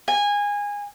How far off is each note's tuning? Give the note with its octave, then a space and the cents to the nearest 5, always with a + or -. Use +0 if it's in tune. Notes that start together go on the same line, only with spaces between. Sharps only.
G#5 -20